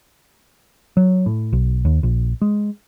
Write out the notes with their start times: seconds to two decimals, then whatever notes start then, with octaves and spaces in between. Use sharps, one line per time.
0.97 F#3
1.26 A2
1.53 B1
1.85 D#2
2.03 A#1
2.42 G#3